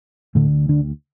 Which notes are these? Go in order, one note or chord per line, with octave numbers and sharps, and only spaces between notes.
D2 A2 D3 A3
D3 D4